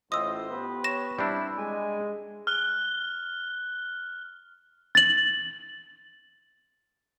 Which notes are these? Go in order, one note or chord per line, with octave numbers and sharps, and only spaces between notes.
A1 A2 F4 C5 D#5 D#6 E6
B3 G4 B4
C#5 A#6 E7
G3 C4 D4 E4
G#3 G#5
F6 F#6 G7
A6 F#7